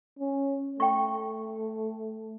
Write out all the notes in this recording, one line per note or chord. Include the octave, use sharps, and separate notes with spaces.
C#4
A3 G5 C#6